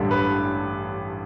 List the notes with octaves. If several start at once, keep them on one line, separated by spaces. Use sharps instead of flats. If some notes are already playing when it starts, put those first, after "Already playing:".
Already playing: A1 G2 D3 G3
B4